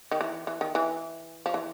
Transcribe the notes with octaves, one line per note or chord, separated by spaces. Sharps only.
D#3
E3
E3
D#3
E3
F3
E3